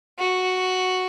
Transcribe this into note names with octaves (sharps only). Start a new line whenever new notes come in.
F#4